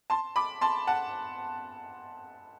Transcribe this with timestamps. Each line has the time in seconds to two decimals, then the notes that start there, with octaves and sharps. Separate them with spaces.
0.10 A5 C6
0.36 B5 D6
0.61 A5 C6
0.87 F#5 A5